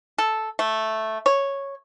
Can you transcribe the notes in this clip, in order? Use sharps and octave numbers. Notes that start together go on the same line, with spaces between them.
A4
A3
C#5